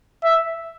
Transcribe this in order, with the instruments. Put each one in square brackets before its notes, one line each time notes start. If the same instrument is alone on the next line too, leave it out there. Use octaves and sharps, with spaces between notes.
[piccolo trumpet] E5